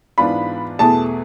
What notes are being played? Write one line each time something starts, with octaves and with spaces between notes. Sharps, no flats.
G#2 E3 B3 D4 F4 B5
E2 B2 A3 E4 G#4 A5